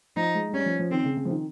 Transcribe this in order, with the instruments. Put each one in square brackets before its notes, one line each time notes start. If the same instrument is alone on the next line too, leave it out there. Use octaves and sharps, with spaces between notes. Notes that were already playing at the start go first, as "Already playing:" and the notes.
[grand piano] F3 [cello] D#4
[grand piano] G#3
G#3
[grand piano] G3 [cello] C#4
[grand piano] F3
F3
[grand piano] D#3 [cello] C4
[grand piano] C#3
C#3
F3
D#3